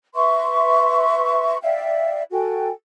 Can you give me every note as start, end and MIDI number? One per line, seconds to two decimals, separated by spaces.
0.15 1.57 71
0.15 1.57 76
0.15 1.57 84
0.15 1.57 85
1.62 2.22 74
1.62 2.22 76
1.62 2.22 77
1.62 2.22 79
2.31 2.70 66
2.31 2.70 69
2.31 2.70 79
2.31 2.70 80